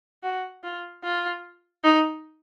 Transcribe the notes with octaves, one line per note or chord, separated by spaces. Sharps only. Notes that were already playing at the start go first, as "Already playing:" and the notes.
F#4
F4
F4
D#4